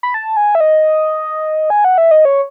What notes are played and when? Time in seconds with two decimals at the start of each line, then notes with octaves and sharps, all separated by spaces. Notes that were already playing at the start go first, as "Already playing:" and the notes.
0.03 B5
0.14 A5
0.37 G#5
0.55 E5
0.60 D#5
1.70 G#5
1.85 F#5
1.98 E5
2.11 D#5
2.25 C#5